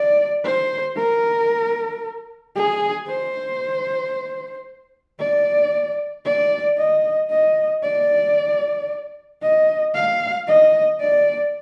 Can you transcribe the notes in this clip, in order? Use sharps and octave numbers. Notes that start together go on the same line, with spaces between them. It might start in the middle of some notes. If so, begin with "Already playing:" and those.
Already playing: D5
C5
A#4
G#4
C5
D5
D5
D#5
D#5
D5
D#5
F5
D#5
D5